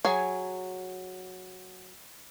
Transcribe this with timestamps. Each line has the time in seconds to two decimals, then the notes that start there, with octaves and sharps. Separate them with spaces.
0.05 F#3 G#4 G#5